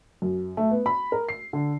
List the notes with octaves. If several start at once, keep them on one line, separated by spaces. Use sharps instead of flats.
F#2
A3
B3
B5
A#4
C7
D3